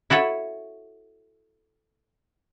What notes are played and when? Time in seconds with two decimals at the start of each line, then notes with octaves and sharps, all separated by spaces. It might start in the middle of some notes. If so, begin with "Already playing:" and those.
0.10 E4 F#4 A4 C#5